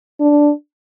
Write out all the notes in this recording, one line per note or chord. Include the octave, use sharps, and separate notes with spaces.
D4